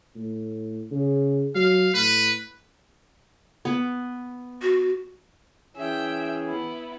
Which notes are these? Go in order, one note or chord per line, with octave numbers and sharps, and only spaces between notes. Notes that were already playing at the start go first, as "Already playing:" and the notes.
A2
C#3
F#3 F5
A2 B4
B3
F#4
E3 C#4 G#4 E5 G5
B3 E4